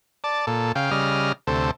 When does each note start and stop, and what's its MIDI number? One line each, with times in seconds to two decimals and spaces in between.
0.24 0.46 74
0.24 0.46 81
0.47 0.72 46
0.47 0.72 69
0.75 0.91 49
0.75 0.91 77
0.75 0.91 79
0.91 1.32 49
0.91 1.32 55
0.91 1.32 75
0.91 1.32 89
1.47 1.71 38
1.47 1.71 48
1.47 1.71 69
1.47 1.71 72